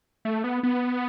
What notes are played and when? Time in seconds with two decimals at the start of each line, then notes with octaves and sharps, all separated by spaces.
0.25 A3
0.44 B3
0.63 B3